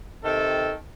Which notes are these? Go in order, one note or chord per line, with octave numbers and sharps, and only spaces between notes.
C3 D#3 A4